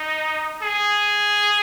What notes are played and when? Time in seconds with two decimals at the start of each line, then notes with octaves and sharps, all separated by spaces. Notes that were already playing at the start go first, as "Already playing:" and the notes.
Already playing: D#4
0.62 G#4